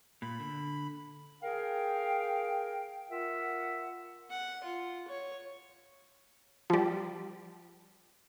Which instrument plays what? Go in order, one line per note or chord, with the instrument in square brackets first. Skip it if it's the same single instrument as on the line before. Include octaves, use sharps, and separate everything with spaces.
[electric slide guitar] A#2 [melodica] B5
[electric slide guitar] D3
[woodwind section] G#4 A#4 F5 G5
F4 A#4 E5 F#5
[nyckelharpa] F#5
F4
C#5
[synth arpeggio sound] F3 G3